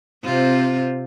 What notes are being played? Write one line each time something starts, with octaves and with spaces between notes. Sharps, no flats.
C3 C4 F4